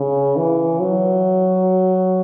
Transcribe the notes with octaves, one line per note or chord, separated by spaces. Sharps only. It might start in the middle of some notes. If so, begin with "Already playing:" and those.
Already playing: C#3
E3
F#3